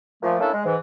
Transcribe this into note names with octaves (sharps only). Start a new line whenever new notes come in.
A#2 F3 A3
A3 A#3 C#4 D4 E4 A4
G#3
G#2 E3